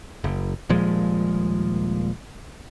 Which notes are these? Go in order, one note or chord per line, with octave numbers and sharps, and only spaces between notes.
F#1
D#1 A#2 F3 G#3